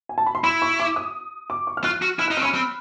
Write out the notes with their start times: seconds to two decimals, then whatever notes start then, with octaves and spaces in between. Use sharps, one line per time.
0.09 G#5
0.18 A5
0.26 B5
0.35 C6
0.44 E4 B5
0.62 C#6
0.80 D6
0.96 D#6
1.50 D6
1.67 C#6
1.77 F6
1.84 F4 F#6
2.02 F#4
2.19 E4 F6
2.28 D#4 F#6
2.37 C4 F6
2.43 C#4 B5
2.54 C4